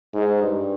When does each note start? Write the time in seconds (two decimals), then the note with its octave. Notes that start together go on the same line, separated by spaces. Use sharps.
0.13 G#2
0.42 G2